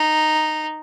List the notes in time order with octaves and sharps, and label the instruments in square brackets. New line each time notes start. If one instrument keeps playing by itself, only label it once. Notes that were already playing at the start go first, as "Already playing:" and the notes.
Already playing: [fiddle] D#4